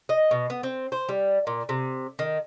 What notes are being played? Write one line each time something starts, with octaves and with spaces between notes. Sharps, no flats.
D#5
B2
B3
C4
C5
G3
A#2
C3
D#3